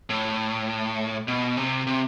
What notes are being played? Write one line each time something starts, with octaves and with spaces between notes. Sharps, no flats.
A2
B2
C3
C3